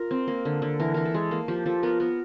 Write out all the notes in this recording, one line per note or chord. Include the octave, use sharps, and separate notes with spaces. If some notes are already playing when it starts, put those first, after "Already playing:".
Already playing: F4 A#4
C4
A#3
D3
D3
E3 A#4
E3 A#4
A4
G#3
A#3
F3 G4
F3 A4
B3 A#4
B3 A#4